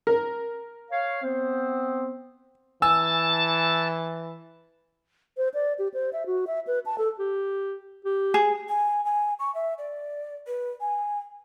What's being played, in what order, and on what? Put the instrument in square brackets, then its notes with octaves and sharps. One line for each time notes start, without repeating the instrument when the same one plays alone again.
[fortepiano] A#4
[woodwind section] C#5 F5
B3 C4 C5
[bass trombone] E3 [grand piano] G#5 E6 [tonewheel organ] A5
[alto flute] C5
D5
G4
C5
E5
F#4
E5
B4
A5
A4
[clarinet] G4
G4
[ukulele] G#4
[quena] G#5
G#5
C#6
E5
D5
B4
G#5